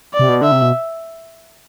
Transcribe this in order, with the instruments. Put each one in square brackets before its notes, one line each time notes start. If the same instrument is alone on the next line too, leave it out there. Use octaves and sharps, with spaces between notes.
[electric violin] D5
[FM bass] C3
B2
[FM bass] D3 [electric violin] E5
[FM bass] C3
B2